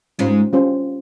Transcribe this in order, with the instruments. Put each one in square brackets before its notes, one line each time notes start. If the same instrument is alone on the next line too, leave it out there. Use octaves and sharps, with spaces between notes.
[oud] G#2 G#3 [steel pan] G3 C#4 F4 C5
[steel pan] G3 C#4 F4 C5